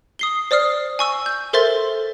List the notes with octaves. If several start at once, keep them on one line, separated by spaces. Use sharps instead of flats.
D#6 C7 G7
C5 D5 D#6 F6 C7
G#5 C#6 E6
G6
A4 A#4 C5 E5 C6 A6